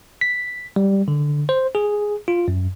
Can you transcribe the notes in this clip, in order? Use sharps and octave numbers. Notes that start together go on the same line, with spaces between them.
B6
G3
D3
C5
G#4
F4
F#2